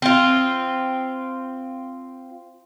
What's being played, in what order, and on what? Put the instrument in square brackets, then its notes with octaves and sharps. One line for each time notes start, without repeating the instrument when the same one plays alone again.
[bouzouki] C4 F4